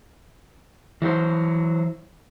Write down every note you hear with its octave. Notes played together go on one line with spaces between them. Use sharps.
E3 F#3 F#4 C5